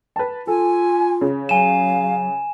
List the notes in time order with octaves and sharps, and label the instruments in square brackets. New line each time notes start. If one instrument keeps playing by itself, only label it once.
[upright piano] B4 A5
[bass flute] F4 [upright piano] A4 [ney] G#5
[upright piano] C#3
[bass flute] F#3 [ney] F5 [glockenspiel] G#5 E7